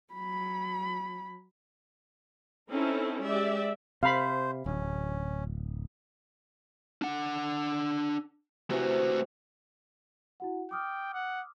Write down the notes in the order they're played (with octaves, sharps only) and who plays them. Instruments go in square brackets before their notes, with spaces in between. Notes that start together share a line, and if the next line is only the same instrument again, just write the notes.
[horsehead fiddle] F#3 B5
[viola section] C4 C#4 D#4 E4 A4
G#3 G4 D5 E5
[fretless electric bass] C3 [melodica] C5 [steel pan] F5 B5
[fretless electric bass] D1 [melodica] C#4
[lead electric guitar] D4 F#5
[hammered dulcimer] C3 E3 [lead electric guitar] A3 F#4
[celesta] E4 F#4 F#5
[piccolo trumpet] G5 [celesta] D6 D#6 F6
[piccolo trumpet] F#5